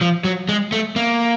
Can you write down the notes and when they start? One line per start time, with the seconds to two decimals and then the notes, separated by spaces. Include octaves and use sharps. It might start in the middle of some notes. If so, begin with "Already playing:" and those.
0.01 F3
0.24 F#3
0.49 G#3
0.72 A3
0.96 A#3